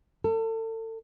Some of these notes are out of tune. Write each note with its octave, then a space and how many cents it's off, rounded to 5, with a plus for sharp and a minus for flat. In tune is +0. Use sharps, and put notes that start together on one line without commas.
A4 +35